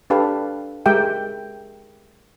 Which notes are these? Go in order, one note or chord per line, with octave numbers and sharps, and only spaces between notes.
D4 G4 A4 B4 F5 A5
G#3 G4 A#4 E5 G5